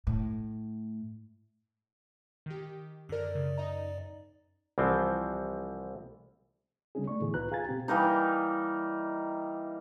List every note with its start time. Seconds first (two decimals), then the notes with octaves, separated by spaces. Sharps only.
0.07 A2
2.46 D#3 G4
3.09 F#2 D3 A#4 D5
3.35 C#3
3.57 D#4 D#5 A#5
4.78 C2 E3 F3 C4
6.95 C#3 G3 C4 C#4 D#4 G#4
7.08 A3 D5 C#6
7.21 A2 D3 E3 B3 E4 G#4
7.34 C2 D#4 F4 B4 A#5 F#6
7.51 G#4 F5 G#5 A#5 G#6 A6
7.67 B2 C4 G4
7.88 E3 G3 A#3 D#4